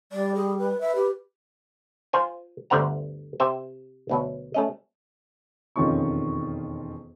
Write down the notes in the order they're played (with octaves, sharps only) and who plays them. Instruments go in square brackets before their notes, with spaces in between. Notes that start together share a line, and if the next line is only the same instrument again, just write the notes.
[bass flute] G3 [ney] D5
[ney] G#4
B4
[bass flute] B4 [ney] E5
[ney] G4
[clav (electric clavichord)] F4 C5 G#5
G1 D2 D3 C5 F#5 A#5
C3 C5 E5 G5
D2 B2 F#3
A3 C#4 D#5
[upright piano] E1 F2 D#3 C#4 F4 C#6